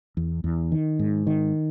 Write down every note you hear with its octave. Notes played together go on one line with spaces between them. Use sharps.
E2
E2
D#3
G#2
D#3